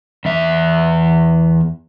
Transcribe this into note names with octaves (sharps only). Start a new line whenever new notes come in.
E2 E5